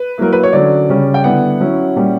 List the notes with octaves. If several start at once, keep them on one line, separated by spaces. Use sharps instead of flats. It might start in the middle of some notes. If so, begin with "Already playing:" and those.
Already playing: B4
F#3 A#3 E4 A#4
B4
C#5
D3 F#3 C#4 D5
C#3 G3 C#4
G5
D3 G3 B3 E4 F#5
F#3 C#4 E4
A#2 G3 C#4